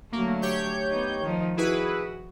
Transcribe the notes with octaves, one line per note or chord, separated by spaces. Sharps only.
D3 F#3 A3 A#3
G4 C#5 G6
B3 D#4
D#3 F3 D#4
E4 F#4 G#4 B4